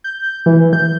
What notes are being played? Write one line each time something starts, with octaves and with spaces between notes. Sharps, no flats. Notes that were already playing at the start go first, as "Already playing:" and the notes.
G6
E3
G6